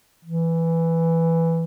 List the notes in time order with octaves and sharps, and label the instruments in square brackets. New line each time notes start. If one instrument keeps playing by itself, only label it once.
[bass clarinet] E3